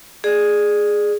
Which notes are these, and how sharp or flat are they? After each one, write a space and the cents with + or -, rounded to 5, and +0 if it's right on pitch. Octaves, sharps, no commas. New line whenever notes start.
G#4 +0 D5 +25